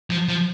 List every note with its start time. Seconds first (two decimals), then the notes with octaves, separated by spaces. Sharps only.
0.10 F3
0.29 F3